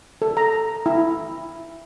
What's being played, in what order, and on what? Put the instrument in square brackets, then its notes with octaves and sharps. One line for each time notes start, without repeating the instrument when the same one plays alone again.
[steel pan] A4
A#5
E4